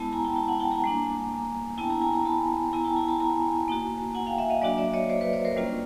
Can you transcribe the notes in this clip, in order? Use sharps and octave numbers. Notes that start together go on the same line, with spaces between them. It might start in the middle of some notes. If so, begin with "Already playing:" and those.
Already playing: G#3 B3 E4 A5 B5
G#5 A#5
G5 A5
G5 A5
F#5 G#5
G5 A5
G#5 A#5
G3 A#3 D4
B3 E4 G5 A5
G#5 A#5
G#5 A#5
G#5 A#5
A5 B5
B3 E4 G#5 A#5
G5 A5
G#5 A#5
A5 B5
G#5 A#5
A#3 D#4 F#4
F#5 G#5
F5 G5
E5 F#5
D#5 F5
F#3 A#3 D4 F#4 D5 E5
D5 E5
C#5 D#5
C5 D5
B4 C#5
C5 D5
A#4 C5
G3 A#3 C#4 F4